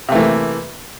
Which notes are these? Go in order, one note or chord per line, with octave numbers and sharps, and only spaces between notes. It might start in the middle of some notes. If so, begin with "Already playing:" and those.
C3 E3 A3 A#3